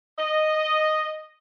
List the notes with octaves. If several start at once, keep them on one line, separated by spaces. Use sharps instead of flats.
D#5